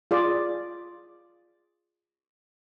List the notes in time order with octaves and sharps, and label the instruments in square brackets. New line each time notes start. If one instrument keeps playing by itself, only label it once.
[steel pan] F4 G#4 D5